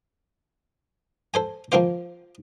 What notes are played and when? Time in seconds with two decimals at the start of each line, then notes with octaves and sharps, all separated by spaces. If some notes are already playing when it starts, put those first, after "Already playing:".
1.34 A4 C5 G#5
1.72 F3 A#3 C4 F4 C5